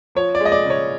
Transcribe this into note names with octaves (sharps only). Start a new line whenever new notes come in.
F3 C#5
D5
G#3
D#5
D5
C#3
C#5